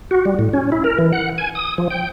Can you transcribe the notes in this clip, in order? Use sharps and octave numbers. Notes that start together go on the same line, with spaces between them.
F#4
G3
A2
C#4
E4
A#4
E3
F#5
G#5
D#6
F3
G5